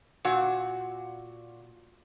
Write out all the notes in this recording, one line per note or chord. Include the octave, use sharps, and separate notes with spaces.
A#2 F#4